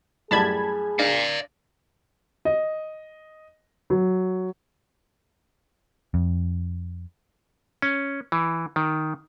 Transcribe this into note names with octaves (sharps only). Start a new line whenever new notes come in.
F#2 A2 G3 G#4 A5 B5 G#6
D4 D5 F5
D#5
F#3
F2
C#4
E3
D#3